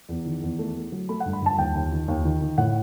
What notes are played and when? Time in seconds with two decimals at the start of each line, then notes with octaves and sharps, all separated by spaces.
0.09 E2
0.25 D#3
0.42 E2
0.59 A3
0.76 A3
0.92 F#3
1.09 A3 B5
1.20 F#5
1.25 G2
1.33 B5
1.42 G2 A5
1.58 D#2 G5
1.75 D#2
1.92 D#3
2.08 D#2
2.24 D#3
2.41 D#3
2.58 A2 F#5